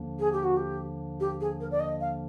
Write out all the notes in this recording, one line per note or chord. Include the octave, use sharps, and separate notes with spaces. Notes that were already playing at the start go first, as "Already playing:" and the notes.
Already playing: D#2 D3 F3 A#3 D4
G#4
G4
F#4
G4
G4
G#4
A#4
D5
D#5
F5